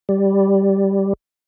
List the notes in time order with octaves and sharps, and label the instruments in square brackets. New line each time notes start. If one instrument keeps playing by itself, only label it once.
[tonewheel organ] G3